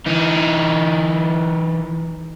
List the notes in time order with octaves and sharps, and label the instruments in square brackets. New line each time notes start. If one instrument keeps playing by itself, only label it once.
[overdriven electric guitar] E3 D#4